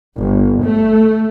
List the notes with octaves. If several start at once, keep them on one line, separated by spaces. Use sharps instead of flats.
G1
A3